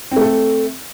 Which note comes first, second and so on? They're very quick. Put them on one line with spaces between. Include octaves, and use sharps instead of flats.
C4 A3 A4